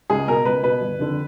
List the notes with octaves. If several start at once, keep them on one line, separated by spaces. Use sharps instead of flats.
C#2 G#4
B2 A#4
C#2 B4
B2 B4
G1
F2 D3